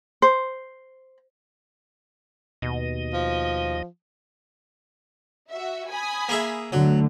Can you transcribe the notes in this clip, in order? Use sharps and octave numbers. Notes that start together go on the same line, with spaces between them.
C5
D#2 B2 D#5
F3
F#4 E5
G#5 B5 D#6
A#3 G#4 E5
D2 A2 D3 F#3